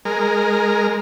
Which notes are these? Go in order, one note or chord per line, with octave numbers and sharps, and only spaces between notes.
G#3 A#4